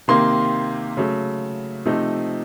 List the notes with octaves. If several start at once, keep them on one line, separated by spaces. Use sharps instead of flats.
C3 D#3 A#3 C6
C#3 F#3 A3
C3 F3 A3 D#4